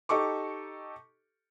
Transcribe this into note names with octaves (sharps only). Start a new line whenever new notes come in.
D#4 G4 A4 C#6 D6